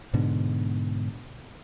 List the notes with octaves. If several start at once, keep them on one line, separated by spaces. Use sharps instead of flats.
G#2 B2 D3